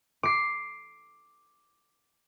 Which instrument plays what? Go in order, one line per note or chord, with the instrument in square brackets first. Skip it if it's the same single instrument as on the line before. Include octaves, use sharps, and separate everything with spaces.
[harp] D6 C7